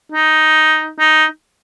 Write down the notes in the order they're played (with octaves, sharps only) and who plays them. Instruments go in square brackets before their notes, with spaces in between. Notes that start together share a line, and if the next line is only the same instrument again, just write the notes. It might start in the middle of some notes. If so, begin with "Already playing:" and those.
[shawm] D#4
D#4